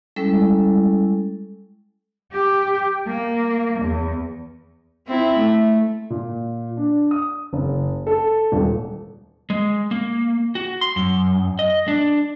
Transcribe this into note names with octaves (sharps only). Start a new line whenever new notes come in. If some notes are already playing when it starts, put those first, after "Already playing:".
G3 G#3 C#4 E4 A4
G4
A#3
E2
C4 E4
A3
A#2
D4
D#6
F#1
A4
D#1
G#3
A#3
F#4
C6
F#2
D#5
D4